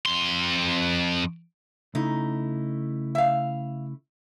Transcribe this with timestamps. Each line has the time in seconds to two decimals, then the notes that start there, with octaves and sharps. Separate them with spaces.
0.06 F2 C6
1.95 C#3 A3 D#4 E4
3.15 E5 F5